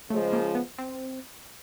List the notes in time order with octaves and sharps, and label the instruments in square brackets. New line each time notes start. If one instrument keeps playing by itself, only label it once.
[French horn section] C#3 F3 G#3 [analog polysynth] A3
[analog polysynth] A#3
B3
C4